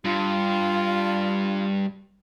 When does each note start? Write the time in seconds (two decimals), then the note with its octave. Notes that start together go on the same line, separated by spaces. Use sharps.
0.05 G2 F4